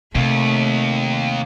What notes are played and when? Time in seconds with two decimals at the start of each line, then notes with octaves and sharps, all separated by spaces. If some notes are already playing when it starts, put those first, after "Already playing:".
0.15 D#2 C3 A3